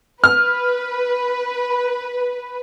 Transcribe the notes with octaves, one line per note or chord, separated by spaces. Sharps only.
B4 F6